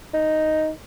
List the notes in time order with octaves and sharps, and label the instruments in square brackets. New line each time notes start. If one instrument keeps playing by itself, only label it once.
[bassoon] D#4